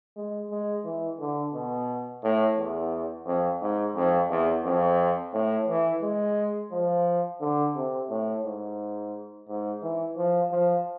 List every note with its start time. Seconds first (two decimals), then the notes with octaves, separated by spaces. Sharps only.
0.16 G#3
0.51 G#3
0.85 E3
1.19 D3
1.54 B2
2.23 A2
2.57 E2
3.26 F2
3.61 G#2
3.96 F2
4.30 E2
4.65 F2
5.33 A2
5.68 E3
6.02 G#3
6.72 F3
7.41 D3
7.75 C3
8.10 A2
8.44 G#2
9.48 G#2
9.83 E3
10.17 F3
10.51 F3